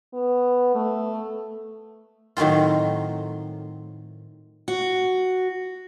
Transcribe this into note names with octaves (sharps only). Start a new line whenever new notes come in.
B3
A3
A2 D#3 F#3 C4 F4
F#4